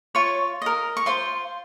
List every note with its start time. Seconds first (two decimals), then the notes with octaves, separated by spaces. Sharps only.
0.15 F4 C#5 C#6
0.62 A#4 D#5
0.97 C#6
1.06 F4 C5 C6